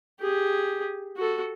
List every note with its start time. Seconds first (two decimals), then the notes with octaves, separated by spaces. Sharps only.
0.20 G4 G#4
1.17 F#4 A4